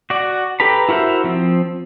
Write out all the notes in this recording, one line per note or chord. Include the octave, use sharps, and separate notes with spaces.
F#4 D5
G4 A4 B4 A#5 B5
E4 F#4 A#4 C5 E5
F3 C4